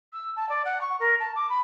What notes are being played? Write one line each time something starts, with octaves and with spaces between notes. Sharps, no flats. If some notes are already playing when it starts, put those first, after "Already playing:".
E6
A5
D5
F#5
C#6
A#4
A5
D6
B5